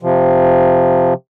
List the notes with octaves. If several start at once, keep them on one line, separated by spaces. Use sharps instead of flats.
C3 F3